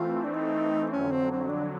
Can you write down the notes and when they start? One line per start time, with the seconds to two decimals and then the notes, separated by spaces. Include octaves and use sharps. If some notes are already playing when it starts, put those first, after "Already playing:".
Already playing: E3 A3 C4 F4
0.24 D4
0.34 D#4
0.91 F2 D3 F#3 C#4
1.11 C4
1.31 C4
1.49 D4